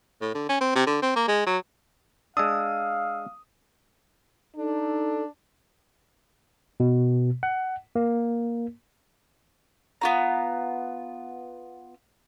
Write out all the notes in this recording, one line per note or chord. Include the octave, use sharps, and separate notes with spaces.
A2
D3
C#4
C4
C3
D3
C4
A#3
G#3
F#3
G#3 D4 F5 D#6 E6
D4 D#4 A4
B2
F#5
A#3
B3 F4 A#5